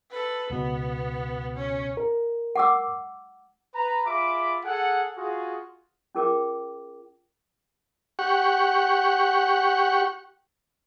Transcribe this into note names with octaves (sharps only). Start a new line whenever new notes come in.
A4 B4
C#2 B2 B3
C#4
A#4
F#5 D6 E6
B4 A#5
F4 G#4 E5 B5 D6
G#4 A4 F#5
F4 F#4 G#4
C#4 F4 G#4 A#4 G5 D6
G4 F#5 C#6